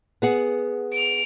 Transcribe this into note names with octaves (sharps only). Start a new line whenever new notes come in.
B3 G#4 F#5
D7 F7